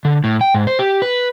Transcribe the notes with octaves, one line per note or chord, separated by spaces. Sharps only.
D3
A2
G5
G#2
C5
G4
B4